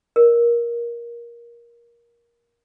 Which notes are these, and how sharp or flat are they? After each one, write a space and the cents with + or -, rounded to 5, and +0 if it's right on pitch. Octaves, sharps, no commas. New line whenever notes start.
A#4 +15 D5 +30